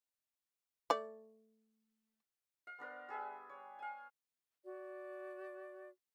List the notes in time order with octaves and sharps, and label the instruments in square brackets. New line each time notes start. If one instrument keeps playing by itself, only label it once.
[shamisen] A3 D5
[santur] F5
B3 D4 A#4 C5
G3 G#4 B4 E5
C#5
F5 G#5
[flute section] F#4 D5